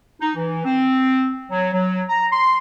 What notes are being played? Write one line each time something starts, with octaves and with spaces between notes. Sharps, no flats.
D#4
E3
C4
F#3
F#3
A#5
C6